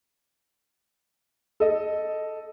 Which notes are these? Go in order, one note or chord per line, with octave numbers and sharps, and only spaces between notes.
A4 D#5